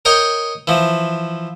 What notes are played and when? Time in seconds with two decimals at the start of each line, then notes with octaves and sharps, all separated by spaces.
0.05 A#4 C#5 D#5 G5
0.67 E3 F3